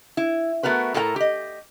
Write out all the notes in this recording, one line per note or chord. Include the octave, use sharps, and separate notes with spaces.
E4
A3 B3 F#4 A#4 B4
A2 A4 A#4 F#5 A#5
G4 D#5